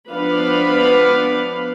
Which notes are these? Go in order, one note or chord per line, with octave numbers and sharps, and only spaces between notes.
F3 B3 D4 B4 F5 B5